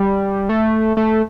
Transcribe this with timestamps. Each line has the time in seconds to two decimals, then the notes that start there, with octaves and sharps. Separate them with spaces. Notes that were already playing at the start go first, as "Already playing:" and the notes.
Already playing: G3
0.49 A3
0.97 A3